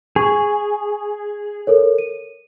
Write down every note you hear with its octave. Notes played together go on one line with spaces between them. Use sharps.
G#4 C#6
A4 A#4 C#5
D#7